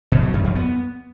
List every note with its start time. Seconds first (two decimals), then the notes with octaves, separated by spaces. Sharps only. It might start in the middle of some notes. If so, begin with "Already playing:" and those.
0.12 B2
0.23 F#3
0.33 F#2
0.44 F2
0.55 B3